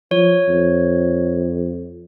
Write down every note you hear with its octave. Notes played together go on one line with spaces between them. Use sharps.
F3 C#5
F2